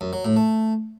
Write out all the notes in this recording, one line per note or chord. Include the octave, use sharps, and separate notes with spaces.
F#2
F#3
A2
A3